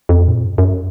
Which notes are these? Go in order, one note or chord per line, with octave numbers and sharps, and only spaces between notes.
F2
A#2
F#2
F#2